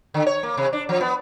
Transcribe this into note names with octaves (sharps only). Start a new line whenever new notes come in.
D3
C#5
A#3
C3
D4
F3
B3